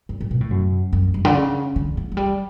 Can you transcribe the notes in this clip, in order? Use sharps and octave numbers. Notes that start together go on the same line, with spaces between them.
F#2
A2
B2
A2
F#2
F#2
G2
D3
C#3
D3
E3
F#3
G3